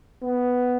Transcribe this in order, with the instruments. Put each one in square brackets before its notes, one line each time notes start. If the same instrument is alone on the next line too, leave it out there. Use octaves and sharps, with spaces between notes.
[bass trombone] B3